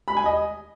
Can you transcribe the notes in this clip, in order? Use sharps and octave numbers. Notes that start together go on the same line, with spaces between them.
B5
G#5
D#5